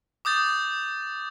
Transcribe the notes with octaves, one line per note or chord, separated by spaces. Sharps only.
D6 D#6 G6 A6